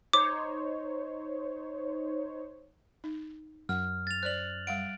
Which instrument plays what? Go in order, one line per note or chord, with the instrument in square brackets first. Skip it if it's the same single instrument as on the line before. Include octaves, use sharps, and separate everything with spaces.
[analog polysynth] D#4 C5 C#5 [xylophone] D6
[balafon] D#4
[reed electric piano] F#2 [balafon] F#5 [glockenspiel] F6
[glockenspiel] A6 F7
[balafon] C5 D5 [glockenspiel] F#6 F#7
[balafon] G3 F5 F#5 [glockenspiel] D7